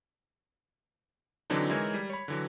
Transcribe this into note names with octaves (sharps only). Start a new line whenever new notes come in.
D3 E3 F#3 C4 D4 D#4
E3 G#3 D#4 A#4 C#5 G#6
G3
C#5 B5
D3 E3 F#3